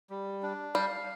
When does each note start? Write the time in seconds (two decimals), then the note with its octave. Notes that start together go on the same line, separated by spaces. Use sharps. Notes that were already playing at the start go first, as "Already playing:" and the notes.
0.10 G3
0.43 D4
0.75 G3 F5